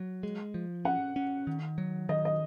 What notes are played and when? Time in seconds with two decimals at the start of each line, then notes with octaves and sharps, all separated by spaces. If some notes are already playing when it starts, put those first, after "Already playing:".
Already playing: F#3
0.23 G#3
0.54 F3
0.85 C#4 F#5
1.16 C#4
1.47 D#3
1.78 F#3
2.09 D#3 D#5
2.25 D#5